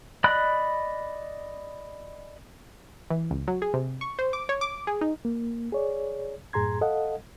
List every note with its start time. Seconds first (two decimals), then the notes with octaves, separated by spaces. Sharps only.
0.24 D5 D#5 B5 F#6
3.10 E3
3.31 C#2
3.48 F#3
3.62 G#4
3.74 C3
4.01 C#6
4.19 C5
4.33 D6
4.49 C#5
4.61 D6
4.87 G#4
5.01 D#4
5.25 A#3
5.72 G#4 C#5 D5
6.53 F#2 A2 G#4 A#5 C6 G#6
6.81 A4 D#5 F5 F#5